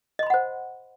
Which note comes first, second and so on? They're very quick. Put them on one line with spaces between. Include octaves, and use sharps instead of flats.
D#5 C6 B5 F#5 C5